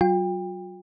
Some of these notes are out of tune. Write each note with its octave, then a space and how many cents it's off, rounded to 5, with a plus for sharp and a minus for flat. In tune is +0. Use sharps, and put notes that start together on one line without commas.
F#3 +35 F4 +45 G5 +25